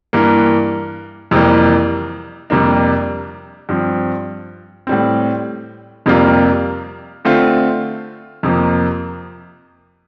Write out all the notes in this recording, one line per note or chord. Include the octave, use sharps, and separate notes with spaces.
G2 E3 A#3
F2 C3 E3 G3 A#3
F2 C3 G3 A#3 D4
G2 F3 C4
A2 G3 C4
F2 C3 G3 A#3 F4
D3 A3 C4 F4
F2 C3 F3 A#3